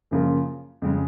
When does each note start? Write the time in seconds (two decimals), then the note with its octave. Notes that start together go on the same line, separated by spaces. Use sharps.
0.11 F#2 C#3 F3 A#3 F4
0.82 F2 C#3 G#3